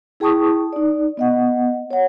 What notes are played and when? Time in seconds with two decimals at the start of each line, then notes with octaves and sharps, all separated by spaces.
0.20 E4 G#4 G5 A5 C#6 D#6
0.73 D#4 D5
1.17 B3 D#5 F#5
1.91 C#5 F#5